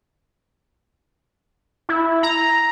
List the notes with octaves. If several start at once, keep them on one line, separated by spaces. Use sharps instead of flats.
E4
A#5